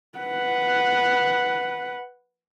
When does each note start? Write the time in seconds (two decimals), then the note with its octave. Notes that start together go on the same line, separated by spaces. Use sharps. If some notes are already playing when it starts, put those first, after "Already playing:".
0.18 B4 F#5